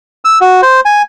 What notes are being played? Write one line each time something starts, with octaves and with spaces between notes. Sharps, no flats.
E6
F#4
C5
G#5